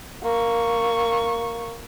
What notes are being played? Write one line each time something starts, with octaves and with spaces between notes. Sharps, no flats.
A#3 C#6